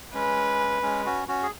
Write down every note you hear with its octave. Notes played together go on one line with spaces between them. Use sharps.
G#3 C#4 B4
G#3 C#4
C#4 F#4
C#4 F#4
G#4